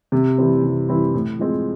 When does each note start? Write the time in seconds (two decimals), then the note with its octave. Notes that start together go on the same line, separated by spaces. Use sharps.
0.12 C3
0.38 E3 G3 C4 E4
0.63 C3
0.88 E3 G3 C4 E4
1.14 A2
1.39 F3 G#3 C4